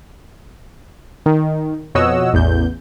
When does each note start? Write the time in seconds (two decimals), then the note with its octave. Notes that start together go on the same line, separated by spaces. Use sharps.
1.26 D#3
1.95 F2 B2 C#5 D#5 F#5 E6
2.33 A1 E2 G6